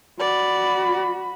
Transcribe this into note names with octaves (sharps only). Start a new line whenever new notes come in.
F#4 D5 B5